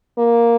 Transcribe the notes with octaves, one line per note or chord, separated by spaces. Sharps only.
A#3